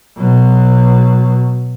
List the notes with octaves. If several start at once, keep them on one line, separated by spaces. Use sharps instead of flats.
B2 F#3